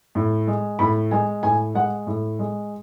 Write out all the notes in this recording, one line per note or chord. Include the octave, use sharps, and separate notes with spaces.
A2
G#3
A2 B5
G#3 G#5
A2 G#5
G#3 F#5
A2
G#3